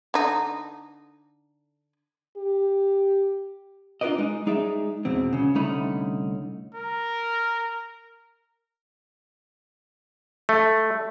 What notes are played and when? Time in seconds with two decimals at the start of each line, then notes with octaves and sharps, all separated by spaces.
0.14 D3 D#4
2.37 G4
4.01 D4 F4 A#4 B4 D5 D#5
4.18 G#3 D#4
4.46 G#3 D#4 G#4 D5 E5
5.05 E2 B2 C4
5.33 C#2 C#3
5.55 C2 D3 A3 C#4 D#4 B5
6.75 A#4
10.49 A3